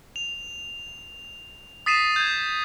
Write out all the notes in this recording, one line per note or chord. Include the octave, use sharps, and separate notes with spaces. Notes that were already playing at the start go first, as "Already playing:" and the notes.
F7
D#6 A6 B6 C7 D#7 E7
G6 G#6